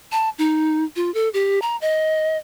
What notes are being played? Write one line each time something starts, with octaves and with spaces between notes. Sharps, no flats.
A5
D#4
F4
A4
G4
A#5
D#5